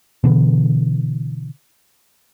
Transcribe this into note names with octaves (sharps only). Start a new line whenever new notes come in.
B2 D3 E3